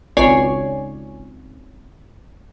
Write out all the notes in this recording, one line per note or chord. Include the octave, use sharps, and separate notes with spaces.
G#1 C#2 C#5 D5 G#5 C7